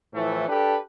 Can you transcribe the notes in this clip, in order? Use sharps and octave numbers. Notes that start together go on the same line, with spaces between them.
A2 E3 F3 A3
D4 G4 A4 B4